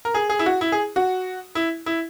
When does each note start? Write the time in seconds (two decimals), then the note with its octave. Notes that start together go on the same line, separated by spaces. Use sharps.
0.05 A#4
0.14 G#4
0.29 G#4
0.39 E4
0.46 F#4
0.61 E4
0.72 G#4
0.96 F#4
1.55 E4
1.86 E4